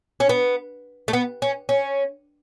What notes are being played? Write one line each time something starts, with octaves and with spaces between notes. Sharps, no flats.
C#4
B3
A3
B3
C#4
C#4